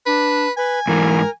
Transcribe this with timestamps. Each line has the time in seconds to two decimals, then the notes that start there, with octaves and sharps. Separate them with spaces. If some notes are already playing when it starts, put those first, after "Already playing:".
0.06 D4 B4
0.57 B4 G#5
0.88 G#2 E3 A#4